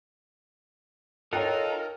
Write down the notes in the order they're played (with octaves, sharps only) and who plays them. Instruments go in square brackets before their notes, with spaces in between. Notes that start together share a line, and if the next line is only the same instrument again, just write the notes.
[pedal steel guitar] D#4 F4 F#5 [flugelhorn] A4 [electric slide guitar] A#4 [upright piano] C#5 G5 A#5